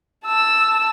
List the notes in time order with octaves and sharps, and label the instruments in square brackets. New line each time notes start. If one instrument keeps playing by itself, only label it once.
[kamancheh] A5 E6